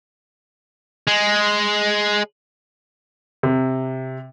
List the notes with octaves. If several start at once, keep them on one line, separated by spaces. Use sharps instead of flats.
G#3
C3